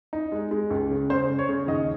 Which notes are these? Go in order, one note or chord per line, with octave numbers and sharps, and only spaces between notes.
D#4
G#3
G#3
C#2
C#3
C#3 C5
C#3
C#5
C#3
D#2 D#5